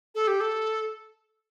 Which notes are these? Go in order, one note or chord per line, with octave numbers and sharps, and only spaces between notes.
A4
G4
A4